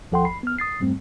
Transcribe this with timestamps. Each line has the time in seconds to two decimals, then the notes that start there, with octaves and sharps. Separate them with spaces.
0.12 D#2 F3 A4 F#5 G5 C6
0.25 G1 B5 C7
0.43 B3 F6
0.58 D#6 A6 C7
0.79 F2 G#2 G3 A3 C4